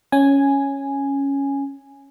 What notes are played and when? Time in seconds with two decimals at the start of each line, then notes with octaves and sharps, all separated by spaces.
0.12 C#4 G#5